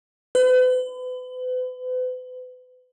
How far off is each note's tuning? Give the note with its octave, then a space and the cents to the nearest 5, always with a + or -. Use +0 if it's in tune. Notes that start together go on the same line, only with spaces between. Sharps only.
B4 +40